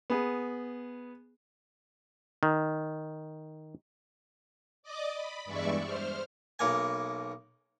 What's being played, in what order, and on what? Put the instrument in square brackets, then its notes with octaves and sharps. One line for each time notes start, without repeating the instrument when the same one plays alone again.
[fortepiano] B3 G#4
[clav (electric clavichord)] D#3
[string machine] D5 D#5 D6 D#6
B5
E2 G2 G#3 D5 E5 C#6
C5 F6
[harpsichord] B1 B2 A#3 G#5